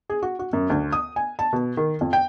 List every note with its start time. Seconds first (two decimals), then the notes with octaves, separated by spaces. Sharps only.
0.10 G#4
0.23 F#4
0.39 F#4
0.53 F#2
0.70 D2
0.92 D#6
1.16 G#5
1.39 A5
1.53 B2
1.77 D#3
2.01 F2
2.13 G5